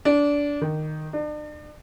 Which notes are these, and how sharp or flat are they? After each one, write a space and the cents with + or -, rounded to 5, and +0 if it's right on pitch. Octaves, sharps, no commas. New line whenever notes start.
D4 -20
D#3 -10
D4 +40